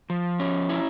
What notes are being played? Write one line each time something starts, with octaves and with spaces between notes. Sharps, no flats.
F3
C#4
E4